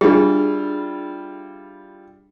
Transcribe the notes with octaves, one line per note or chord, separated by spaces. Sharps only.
G3 D4 E4 F4 G#4